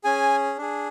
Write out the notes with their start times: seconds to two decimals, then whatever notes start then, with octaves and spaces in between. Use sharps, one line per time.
0.04 C#4 G#4 G#5
0.58 D4 G#4